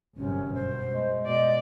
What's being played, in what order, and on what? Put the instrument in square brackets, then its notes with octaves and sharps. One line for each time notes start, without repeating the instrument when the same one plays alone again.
[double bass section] G1 F#2 C3 [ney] C#4
[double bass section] B2 [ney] C5
[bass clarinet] G#3
[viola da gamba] B2 D5 [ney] D#5